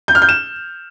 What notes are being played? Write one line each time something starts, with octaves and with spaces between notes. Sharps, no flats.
G6
F6
G6
E7